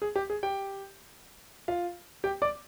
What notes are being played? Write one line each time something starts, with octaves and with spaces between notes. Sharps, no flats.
G#4
G4
G#4
G4 G5
F4 F5
G4 G5
D5 D6